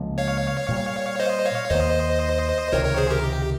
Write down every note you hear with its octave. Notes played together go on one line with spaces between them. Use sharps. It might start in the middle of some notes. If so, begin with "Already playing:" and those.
Already playing: C#2 C#3 F3 A#3
C#5 F5
A#2 G3 A#3
C5 D#5
C#5 F5
D#2 D#3 A#3 C5 D#5
C#2 C3 D#3 A#4 C#5
A#4 C#5
G#4 C5
G4 A#4
G4